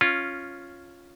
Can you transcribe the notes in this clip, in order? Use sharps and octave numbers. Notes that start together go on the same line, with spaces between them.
C#4 F4